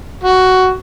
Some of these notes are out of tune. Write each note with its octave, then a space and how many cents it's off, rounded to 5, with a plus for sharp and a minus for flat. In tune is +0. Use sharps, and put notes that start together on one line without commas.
F#4 +10